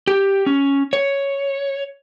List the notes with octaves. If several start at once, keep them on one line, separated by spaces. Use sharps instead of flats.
G4
C#4
C#5